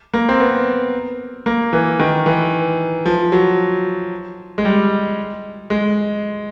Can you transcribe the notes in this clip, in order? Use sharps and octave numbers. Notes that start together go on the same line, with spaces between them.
A#3
C4
B3
A#3
E3
D#3
E3
F3
F#3
G#3
G3
G#3